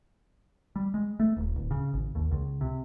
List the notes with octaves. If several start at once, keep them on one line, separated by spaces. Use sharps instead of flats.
G3
G#3
A3
D#1
D1
C#3
G#1
D#2
C#2
C3